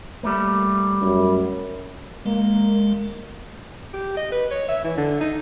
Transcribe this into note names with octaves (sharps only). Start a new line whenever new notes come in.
G3 A3 A#3
F#2
G#3 A#3
G4
D#5
B4
C#5
E5
E3
D3
D#4